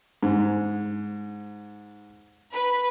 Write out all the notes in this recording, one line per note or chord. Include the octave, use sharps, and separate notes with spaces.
G#2
B4